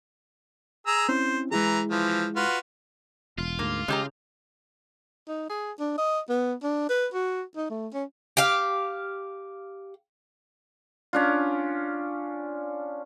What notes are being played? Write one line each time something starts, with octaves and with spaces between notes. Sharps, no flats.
G#4 A#5 E6
C4 C#4 E4 C5
E3 G#3 E4 G#4 A#5
E3 F3
F4 F#4 B4
E1 F4
D2 G#2 A#3
C#3 G#3 G4 A#5
D#4
G#4
D4
D#5
B3
D4
B4
F#4
D#4
A3
C#4
G4 F5
C#4 D4 F4